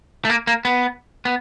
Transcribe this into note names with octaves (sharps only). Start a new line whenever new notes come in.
A3
A#3
A#3
B3
B3